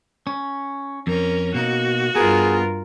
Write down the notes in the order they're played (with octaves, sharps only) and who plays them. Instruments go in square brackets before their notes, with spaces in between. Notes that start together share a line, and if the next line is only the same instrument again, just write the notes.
[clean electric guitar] C#4
[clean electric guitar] F2 [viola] C#4 A#4
[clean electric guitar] B2 A#3 D#4 [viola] F#4
[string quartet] G2 F4 A#4 [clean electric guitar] B3 [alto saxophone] G#4